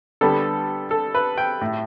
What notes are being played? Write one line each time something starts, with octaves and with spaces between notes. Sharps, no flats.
D3 G3 B3 A4
A4
B4
G5
A2 A3